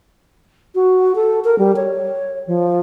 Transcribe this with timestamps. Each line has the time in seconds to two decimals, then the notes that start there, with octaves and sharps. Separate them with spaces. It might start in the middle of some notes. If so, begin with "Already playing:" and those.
0.75 F#4
1.15 A4
1.44 A#4
1.58 G3
1.76 C#5
2.47 F3